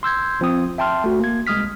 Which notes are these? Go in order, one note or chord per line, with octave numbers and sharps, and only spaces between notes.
C6 E6 G6 G#6
A#1 F3 C4 D#6
E5 G5 A5 C6 F6
A3 F#4
A#3 G#6
C2 G#3 D#6 F6 B6